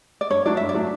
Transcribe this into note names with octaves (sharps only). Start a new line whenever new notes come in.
D5
G2 C#5
F#3 A3 D4 D5
G2 E5
D5
F#3 A3 D4